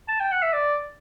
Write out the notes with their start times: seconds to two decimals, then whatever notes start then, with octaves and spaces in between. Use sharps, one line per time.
0.08 A5
0.20 G5
0.32 F#5
0.43 E5
0.53 D5